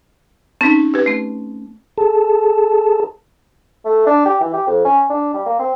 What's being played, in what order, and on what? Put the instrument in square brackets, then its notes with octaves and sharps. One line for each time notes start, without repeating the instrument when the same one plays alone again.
[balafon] C4 D#4 [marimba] C#4
[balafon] G4 B4
[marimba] A3 C4
[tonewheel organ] G#4 A4 A5
[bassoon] A3
D4
G4
E3
G4
F2
C#4
D4
G3
A#3
C4